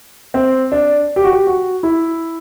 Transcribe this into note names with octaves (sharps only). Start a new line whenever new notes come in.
C4
D4
G4
F#4
G4
F#4
E4